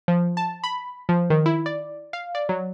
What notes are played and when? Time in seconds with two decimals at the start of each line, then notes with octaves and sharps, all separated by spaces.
0.08 F3
0.37 A5
0.64 B5
1.09 F3
1.30 D#3
1.46 E4
1.66 D5
2.13 F5
2.35 D5
2.49 F#3